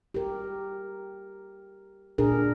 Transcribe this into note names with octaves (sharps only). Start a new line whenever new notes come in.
G4 A#4
A#2 D4 G#4 A#4